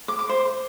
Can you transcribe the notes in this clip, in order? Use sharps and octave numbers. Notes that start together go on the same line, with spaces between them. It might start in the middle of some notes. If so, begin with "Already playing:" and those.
D6
D6
C5